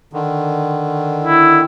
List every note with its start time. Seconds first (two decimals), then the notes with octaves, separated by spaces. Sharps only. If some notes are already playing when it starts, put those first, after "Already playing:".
0.13 D3 D#3
1.24 E4